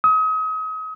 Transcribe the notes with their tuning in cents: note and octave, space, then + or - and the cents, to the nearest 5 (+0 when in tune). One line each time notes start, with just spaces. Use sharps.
D#6 +35